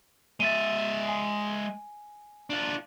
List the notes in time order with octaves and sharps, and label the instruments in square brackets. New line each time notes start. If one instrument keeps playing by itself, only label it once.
[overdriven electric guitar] G#3 E5 [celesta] A6 D#7
[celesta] G#5
[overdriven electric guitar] D4 F4